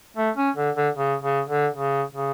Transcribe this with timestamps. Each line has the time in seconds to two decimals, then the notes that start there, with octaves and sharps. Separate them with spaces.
0.16 A3
0.36 C#4
0.56 D3
0.75 D3
0.96 C#3
1.22 C#3
1.49 D3
1.75 C#3
2.15 C#3